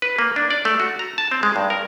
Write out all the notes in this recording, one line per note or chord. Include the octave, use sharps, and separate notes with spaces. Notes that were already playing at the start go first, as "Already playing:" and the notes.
B4
A#3
D4
D5
A3
F#4
A#5
A5
C4
G#3
G2
A#4